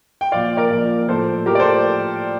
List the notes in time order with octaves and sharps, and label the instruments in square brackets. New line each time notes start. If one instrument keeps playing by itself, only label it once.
[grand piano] G5
A#2 F3 D5 F5
A#4 D5
A#2 F3
A2 F3 A4 C5
A2 F3 G4 A#4
D5
A4 C5